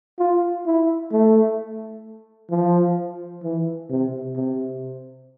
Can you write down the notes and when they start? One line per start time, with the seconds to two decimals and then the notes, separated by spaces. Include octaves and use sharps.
0.19 F4
0.66 E4
1.12 A3
2.50 F3
3.43 E3
3.90 C3
4.36 C3